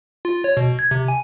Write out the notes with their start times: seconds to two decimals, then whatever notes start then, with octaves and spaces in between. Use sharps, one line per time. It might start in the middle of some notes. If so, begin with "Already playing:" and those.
0.25 F4
0.44 C#5
0.57 B2
0.79 G#6
0.91 C3
1.08 G#5